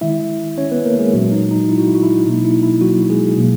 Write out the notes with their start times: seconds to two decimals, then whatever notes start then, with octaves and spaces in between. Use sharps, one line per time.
0.01 D#3 G#3 E4 E5
0.58 C#4 C#5
0.71 B3 B4
0.85 A#3 A#4
0.99 G#3 G#4
1.13 A#2 F#3 G#3 F#4
1.32 D#4
1.51 D#4
1.69 E4
1.78 F#4
1.87 E4
1.95 F#4
2.03 E4
2.26 B2 F#3 A#3 D#4
2.45 E4
2.63 E4
2.81 F#3 F#4
3.10 G#3 G#4
3.38 B2 F#3 A#3